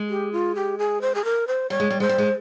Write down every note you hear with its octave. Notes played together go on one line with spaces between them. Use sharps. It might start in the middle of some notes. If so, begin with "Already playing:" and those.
Already playing: G#3
G4
F4
G4
G#4
C5
G#4
A#4
C5
G3 C#5
G#3
G3
G#3 C5
G3
G#3